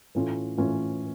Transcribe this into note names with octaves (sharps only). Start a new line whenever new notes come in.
A2 E3 A3 C#4 F4
A2 E3 A3 C#4 F4